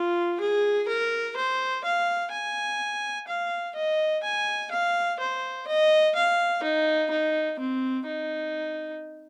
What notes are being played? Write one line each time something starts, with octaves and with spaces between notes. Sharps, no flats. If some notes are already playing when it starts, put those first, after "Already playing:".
Already playing: F4
G#4
A#4
C5
F5
G#5
F5
D#5
G#5
F5
C5
D#5
F5
D#4
D#4
C4
D#4